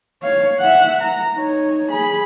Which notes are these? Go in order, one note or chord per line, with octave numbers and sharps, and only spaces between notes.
C#5 F5
E5 F#5
A#5
D#4 C#5
G#4 B5